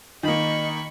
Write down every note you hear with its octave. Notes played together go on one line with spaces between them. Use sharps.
D#3 A#3 D#5 B5 C#6